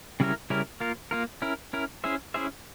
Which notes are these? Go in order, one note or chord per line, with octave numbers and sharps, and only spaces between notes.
C#3 G3 C#4 E4 A#4
C#3 G3 C#4 E4 A#4
A#3 F4 A#4
A#3 F4 A#4
C#4 E4 A#4
C#4 E4 A#4
C#4 E4 G#4 C5 E5
C#4 E4 G#4 C5 E5